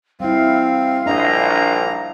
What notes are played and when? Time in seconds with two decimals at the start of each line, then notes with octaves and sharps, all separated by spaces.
0.20 G3 C4 E4 F5
1.06 A#1 D4 D#5 E5 A#5